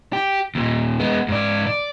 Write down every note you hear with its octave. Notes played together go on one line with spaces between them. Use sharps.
G4
D#2 A#2
G#3 B3
G#2 D5
D5